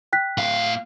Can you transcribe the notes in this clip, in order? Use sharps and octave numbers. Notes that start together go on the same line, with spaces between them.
G5 F#6 B6
A2 F5